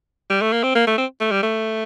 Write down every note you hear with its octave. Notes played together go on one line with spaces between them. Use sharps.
G3
A3
A#3
C4
A#3
A3
C4
A3
G3
A3